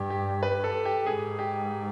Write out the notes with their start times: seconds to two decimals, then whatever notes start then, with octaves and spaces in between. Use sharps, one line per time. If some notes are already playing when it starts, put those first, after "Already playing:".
Already playing: G2 G4
0.10 G4
0.43 B4
0.64 A4
0.85 G4
1.06 G#2 G#4
1.39 G4